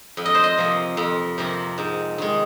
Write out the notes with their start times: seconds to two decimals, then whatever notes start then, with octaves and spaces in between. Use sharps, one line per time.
0.17 F2
0.25 D#5
0.35 C5
0.44 D#5
0.58 C3 F3 A#3
0.97 F2
1.38 C3 F3 A#3
1.78 G#2
2.18 D#3 G#3